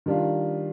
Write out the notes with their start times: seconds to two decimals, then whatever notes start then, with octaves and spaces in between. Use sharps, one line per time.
0.06 D#3 G3 D4 F4